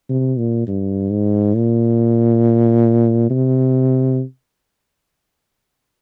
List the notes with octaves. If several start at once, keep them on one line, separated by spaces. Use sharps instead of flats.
C3
A#2
G2
G#2
A#2
C3